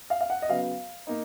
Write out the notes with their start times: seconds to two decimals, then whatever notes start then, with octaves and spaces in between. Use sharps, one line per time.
0.10 F5
0.21 F5
0.30 F#5
0.42 D#5
0.49 C#3 F#3 B3 F5
1.07 A#3 D#4